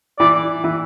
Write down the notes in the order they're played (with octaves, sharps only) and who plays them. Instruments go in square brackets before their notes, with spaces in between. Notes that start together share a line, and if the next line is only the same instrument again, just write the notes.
[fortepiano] E3 [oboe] D5
[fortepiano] E3